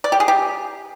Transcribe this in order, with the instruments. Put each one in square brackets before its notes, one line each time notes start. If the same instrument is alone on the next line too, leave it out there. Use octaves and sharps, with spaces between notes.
[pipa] D5
G4
G#4
G4